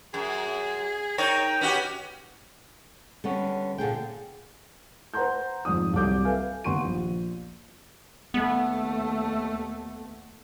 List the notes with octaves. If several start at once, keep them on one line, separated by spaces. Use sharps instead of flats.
F#2 G#4
D#4 A#4 C#5 G5
C#4 F#4 G4 B4
D3 G3 B3 C#4
A#2 D3 G#4 G5
B4 C5 F#5 A#5 C6 G6
D#1 F2 G#2 D#6
C2 F#3 A4 D6 G6
A4 B4 E5 F5 G#5
D#2 B3 C6 C#6 D#7
A#1
D#2 A3 B3